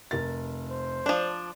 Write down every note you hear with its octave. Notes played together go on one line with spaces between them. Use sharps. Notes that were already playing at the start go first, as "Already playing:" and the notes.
F1 A#4 A6
C5
F3 D4 D5